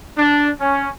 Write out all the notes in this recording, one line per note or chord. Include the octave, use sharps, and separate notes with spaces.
D4
C#4